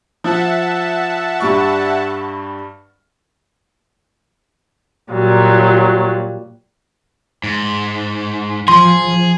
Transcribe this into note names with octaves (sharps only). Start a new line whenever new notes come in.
F3 E5 F#5 A5
G2 G3 C#6
A#2 F#3 G3
G#2
F3 G#4 C6